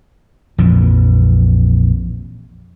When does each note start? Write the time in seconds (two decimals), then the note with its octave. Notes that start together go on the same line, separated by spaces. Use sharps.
0.58 A#1 F2 E3